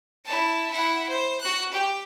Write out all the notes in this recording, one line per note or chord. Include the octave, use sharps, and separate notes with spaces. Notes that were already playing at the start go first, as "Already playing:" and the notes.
E4 A5
E4 F#5
C5
F#4 F#6
G4 G5